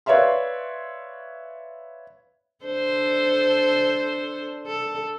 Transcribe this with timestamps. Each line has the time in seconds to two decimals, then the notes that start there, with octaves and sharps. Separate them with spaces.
0.06 B4 C#5 D5 E5 F5 C6
2.64 D4 A4 C5
4.67 A4